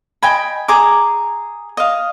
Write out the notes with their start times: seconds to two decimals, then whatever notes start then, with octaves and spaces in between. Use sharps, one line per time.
0.23 D#5 G5 G#5 B5
0.68 G#4 A#5 D6
1.77 D#5 F5